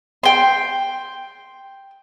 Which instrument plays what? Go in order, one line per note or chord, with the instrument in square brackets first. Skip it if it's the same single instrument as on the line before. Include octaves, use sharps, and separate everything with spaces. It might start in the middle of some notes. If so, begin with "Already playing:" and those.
[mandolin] G5 C6